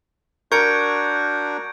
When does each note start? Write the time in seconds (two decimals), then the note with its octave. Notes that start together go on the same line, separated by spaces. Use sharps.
0.52 D4 F#4 A#4 C#6 G6 G#6 C#7 D7